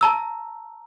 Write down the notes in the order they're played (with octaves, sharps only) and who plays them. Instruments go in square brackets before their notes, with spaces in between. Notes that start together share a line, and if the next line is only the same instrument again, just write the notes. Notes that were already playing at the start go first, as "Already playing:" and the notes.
[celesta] A5 A#5 E6